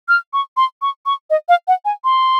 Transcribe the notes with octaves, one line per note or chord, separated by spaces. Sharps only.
F6
C#6
C6
C#6
C#6
D#5
F5
F#5
G#5
C6